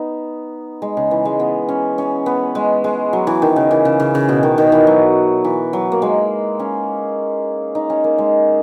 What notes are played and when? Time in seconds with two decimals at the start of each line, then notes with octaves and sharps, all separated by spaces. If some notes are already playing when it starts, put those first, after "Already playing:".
Already playing: B3 D#4
0.82 G#3
0.97 C#3
1.11 E3
1.25 G#3
1.40 B3
1.69 C#4
1.98 C#4
2.26 B3
2.55 G#3
2.84 G#3
3.13 F#3
3.27 E3
3.42 D#3
3.56 C#3
3.71 E3
3.85 C#3
4.00 C#3
4.15 C#3
4.29 B2
4.43 D#3
4.58 D#3
4.72 E3
4.87 F#3
5.44 E3
5.73 F#3
5.92 A#3
6.02 G#3
6.59 C#4
7.75 D#4
7.90 C#4
8.04 A#3
8.18 G#3